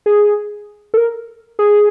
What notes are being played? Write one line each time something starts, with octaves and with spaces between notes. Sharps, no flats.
G#4
A4
A#4
G#4